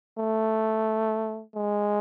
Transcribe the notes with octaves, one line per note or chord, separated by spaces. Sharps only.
A3
G#3